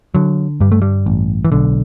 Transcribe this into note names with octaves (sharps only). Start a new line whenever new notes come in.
D3 F#3
G2 G3
A3
G3
A1
E3
B1 D3